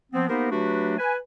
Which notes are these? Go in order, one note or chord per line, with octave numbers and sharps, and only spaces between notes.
F3 B3 C4
A#3 B3 D#4 G4 A#4 C5
F#3 A3 D4 F#4 G4 B4
B4 G#5